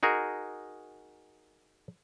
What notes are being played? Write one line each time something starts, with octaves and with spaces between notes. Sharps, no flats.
D#4 F#4 G#4 A#4